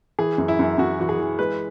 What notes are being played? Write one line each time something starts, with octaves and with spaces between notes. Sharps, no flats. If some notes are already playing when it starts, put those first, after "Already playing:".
E3 G#4
F#2
E4
F#2
F#2 F#4
E3 F#4
G#4
E3
G#3 B4